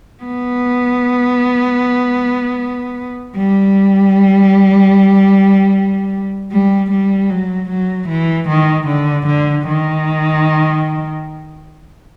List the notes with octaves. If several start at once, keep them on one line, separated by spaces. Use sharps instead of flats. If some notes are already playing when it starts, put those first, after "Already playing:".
B3
G3
G3
G3
F#3
F#3
E3
D#3
D3
D3
D#3